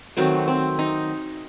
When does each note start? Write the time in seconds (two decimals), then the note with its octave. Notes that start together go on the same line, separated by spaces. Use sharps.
0.17 D#3 F#3 A3 C4
0.48 C4
0.79 D#4